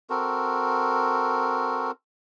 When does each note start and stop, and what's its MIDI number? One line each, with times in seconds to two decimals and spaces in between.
0.10 1.91 60
0.10 1.91 66
0.10 1.91 69
0.10 1.91 70